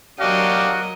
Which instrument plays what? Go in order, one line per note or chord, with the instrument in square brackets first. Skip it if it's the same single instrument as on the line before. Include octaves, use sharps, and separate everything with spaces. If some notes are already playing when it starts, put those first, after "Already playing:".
[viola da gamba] F#3 A#4 D#5 [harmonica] D4 G4 F5 [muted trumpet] F#4